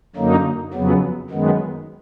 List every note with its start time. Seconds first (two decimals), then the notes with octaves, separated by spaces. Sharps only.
0.15 F#2 D3 F#3 A#3 D#4
0.73 F2 C#3 F#3 B3
1.30 F#2 D#3 G#3 B3